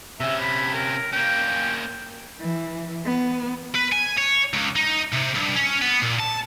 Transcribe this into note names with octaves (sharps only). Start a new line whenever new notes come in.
C3 C#4 E5
B5
A#4
A#3 C#4 G5
E3
B3
B4
G#5
C#5
C#2
D#4
C3
G2
C#4
B3
A#2
A5